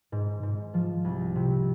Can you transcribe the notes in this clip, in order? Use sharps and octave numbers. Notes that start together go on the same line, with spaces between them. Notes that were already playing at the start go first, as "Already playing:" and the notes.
G#2
G#2
F3
C2
C3